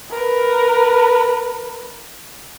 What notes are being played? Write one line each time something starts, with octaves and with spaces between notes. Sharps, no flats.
A#4 B4